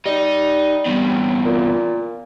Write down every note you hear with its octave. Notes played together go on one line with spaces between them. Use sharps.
G3 D#4
E2 G2
A#2